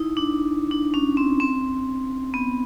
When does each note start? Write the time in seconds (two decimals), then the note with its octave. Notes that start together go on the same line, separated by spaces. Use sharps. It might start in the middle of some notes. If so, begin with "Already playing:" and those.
Already playing: D#4 E4
0.17 D4
0.71 D4
0.94 C#4
1.17 C4
1.40 C4
2.34 B3